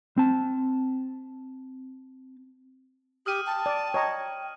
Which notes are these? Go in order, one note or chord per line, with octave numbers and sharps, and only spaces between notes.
C4 A5
G4 D#6 F6 D#7
G5 A5
D5
C#5 D#5 A#5